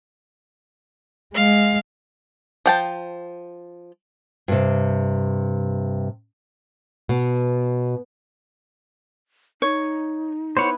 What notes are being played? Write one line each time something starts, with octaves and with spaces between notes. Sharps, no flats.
G#3 F5
F3 G5 A5
G2 C3
B2
D#4 C#5
B3 E4 C5 C#5 F#5